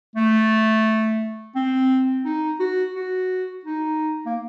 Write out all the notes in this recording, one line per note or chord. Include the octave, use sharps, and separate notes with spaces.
A3
C4
D#4
F#4
F#4
D#4
A#3